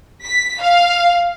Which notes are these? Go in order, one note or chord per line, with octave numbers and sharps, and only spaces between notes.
B6
F5